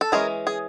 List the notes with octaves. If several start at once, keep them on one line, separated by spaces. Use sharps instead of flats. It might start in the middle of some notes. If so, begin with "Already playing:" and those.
A4
E3 G#3 C#4 G#4 A#4
G#4